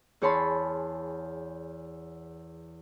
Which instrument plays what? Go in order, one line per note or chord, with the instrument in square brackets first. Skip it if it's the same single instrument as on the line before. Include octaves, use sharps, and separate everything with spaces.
[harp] E2 G#4 C#5 A5 B5 C6